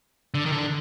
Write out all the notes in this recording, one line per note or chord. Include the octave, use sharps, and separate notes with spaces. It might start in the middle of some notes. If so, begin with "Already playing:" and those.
D3
D#3
D3